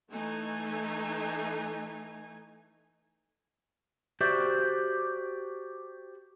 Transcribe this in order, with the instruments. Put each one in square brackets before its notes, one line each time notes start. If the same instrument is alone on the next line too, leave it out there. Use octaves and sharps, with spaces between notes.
[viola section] E3 A3 D#4 G#5
[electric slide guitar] F#4 G4 C5 D5 E5